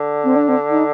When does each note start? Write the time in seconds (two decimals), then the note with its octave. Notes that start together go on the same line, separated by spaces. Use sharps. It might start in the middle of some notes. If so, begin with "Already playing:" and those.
Already playing: D3
0.24 C4
0.36 D4
0.49 C4
0.70 D#4